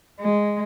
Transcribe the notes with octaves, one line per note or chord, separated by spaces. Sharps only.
G#3